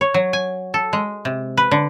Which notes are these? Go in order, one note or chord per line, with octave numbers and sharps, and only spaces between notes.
C#5
F#3
G#5
A4
G#3
C3
B4
D3